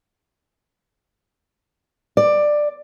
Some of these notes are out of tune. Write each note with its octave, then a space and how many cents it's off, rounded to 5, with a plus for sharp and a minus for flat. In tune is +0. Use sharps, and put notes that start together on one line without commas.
D5 +15